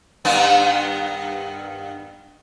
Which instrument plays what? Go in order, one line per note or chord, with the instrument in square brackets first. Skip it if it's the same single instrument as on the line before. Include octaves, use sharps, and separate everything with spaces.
[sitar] G2 D#3 B3